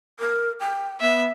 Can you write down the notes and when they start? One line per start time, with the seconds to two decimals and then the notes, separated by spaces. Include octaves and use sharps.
0.19 A#4
0.60 G5
1.01 B3 E5